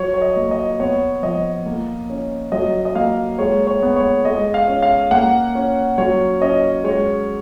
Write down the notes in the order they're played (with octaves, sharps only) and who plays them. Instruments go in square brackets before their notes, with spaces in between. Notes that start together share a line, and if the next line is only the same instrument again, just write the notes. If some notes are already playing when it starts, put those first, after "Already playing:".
Already playing: [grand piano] F#3 C#5
C#5
D#5
A#3
D#5
B3 C#5
F3 D#5
A#3
C#4
F#3 D#5
D#5
A#3 F5
G#3 C#5
C#5
B3
C#5
G#3 D#5
F5
C#4
F5
A#3 F#5
C#4
F#3 C#5
C#4 D#5
G#3 C#5